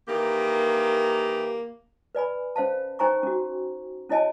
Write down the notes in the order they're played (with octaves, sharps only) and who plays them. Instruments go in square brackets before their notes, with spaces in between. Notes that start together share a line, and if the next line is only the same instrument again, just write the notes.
[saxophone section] D#3 E3 G4 [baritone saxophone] A#3
[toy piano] B4 D5 G#5 B5
C#4 C5 F5 A5
D#4 C5 G5 G#5 A#5 C#6
C#4 F#4
C#4 E4 C#5 D#5 G#5 A5